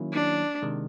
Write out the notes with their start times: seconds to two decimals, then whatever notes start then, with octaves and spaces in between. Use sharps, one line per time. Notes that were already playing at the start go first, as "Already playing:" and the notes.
Already playing: D#3 F#3 A#3 C#4 E4
0.13 D4
0.62 C3 D#3 G#3